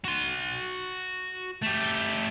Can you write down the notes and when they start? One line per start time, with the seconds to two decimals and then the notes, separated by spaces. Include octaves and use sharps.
0.05 F#4 C6
1.63 A3 G4